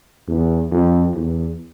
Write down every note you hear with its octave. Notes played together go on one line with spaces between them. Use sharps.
E2
F2
E2